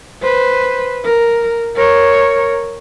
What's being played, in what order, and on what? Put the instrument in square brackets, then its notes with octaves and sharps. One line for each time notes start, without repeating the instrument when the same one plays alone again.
[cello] B4 C5
A#4
A#4 C#5